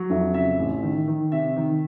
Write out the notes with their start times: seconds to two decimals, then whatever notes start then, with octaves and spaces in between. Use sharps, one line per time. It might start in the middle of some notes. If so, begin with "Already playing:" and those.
Already playing: F#3
0.10 F2 E5
0.34 C#3 E5
0.59 A1
0.83 D#3
1.08 D#3
1.32 C3 E5
1.56 D#3